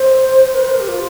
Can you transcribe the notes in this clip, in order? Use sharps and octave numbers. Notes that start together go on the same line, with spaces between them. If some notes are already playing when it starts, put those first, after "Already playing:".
Already playing: C5
A#4
C5
A#4
G4
F4